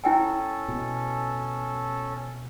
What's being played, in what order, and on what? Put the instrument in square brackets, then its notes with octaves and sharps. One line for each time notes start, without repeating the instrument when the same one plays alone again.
[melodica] C#4 A4 [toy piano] E4 G5 G#5
[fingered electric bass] B2